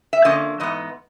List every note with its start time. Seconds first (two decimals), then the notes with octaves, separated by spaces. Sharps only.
0.13 E5
0.24 D3 F3 A#3 C#4 D#5
0.60 G#2 E3 B3 D#5